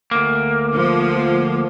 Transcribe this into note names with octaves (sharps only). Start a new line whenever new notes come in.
D2 A#3
F3